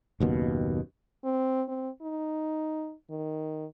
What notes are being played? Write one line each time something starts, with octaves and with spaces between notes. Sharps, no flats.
F#1 D#2 B2
C4
C4
D#4
D#3